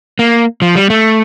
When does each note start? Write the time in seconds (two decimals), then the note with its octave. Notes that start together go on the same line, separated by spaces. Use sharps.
0.19 A#3
0.62 F3
0.76 G3
0.90 A3